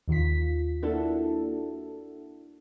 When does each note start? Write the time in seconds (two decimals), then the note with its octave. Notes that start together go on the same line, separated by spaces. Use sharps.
0.08 D#2 D#3 F4 B6
0.83 A#3 D4 E4 F#4 A4